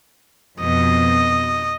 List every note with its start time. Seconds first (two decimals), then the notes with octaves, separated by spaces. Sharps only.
0.61 F2 B2 D#5